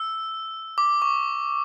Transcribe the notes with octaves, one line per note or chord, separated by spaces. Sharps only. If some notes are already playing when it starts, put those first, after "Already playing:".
Already playing: E6
D6
C#6